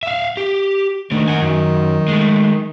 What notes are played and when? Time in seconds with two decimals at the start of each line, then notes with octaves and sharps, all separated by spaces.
0.03 E5 F5
0.37 G4
1.11 D#3 A3 D4
1.28 F#5 G#5
1.42 F#2
2.08 G#3 A3